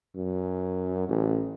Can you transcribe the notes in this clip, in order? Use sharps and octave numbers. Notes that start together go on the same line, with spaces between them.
F#2
A1